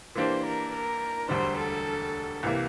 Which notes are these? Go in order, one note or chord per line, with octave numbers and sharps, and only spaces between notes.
E3 A#3 D4 G4 C5
A#4
A#4
E1 D2 D3 G3 D4 C5
A4
C2 C3 E3 A#3